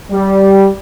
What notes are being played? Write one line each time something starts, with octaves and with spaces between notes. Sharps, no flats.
G3